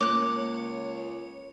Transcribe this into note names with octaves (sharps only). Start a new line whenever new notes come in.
C#2 A#3 C#5 D6 F#6